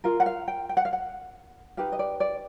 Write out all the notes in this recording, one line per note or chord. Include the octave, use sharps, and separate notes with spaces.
F4 A#4 F5
F#5
F5
G5
G5
F#5
F5
F#5
D#4 G4 B4 F5
D#5
D5
D5